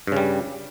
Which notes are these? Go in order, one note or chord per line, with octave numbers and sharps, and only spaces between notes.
G2 C#3 G3